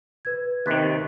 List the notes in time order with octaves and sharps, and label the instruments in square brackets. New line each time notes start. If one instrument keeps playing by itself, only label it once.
[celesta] B4 G#6
[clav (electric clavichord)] D#2 C3 D#3 [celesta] F#6 A6 B6